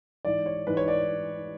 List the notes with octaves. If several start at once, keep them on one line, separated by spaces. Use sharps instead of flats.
G#2 E3 D5
C#5
G#2 E3 B4
C#5
D5